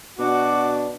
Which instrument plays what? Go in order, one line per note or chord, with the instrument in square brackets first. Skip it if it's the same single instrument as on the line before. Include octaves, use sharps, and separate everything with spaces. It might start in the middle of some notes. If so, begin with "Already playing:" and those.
[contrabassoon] B2 [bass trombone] D4 [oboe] F#4 [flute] D6